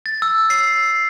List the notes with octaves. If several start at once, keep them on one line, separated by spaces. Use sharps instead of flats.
A6
E6
C7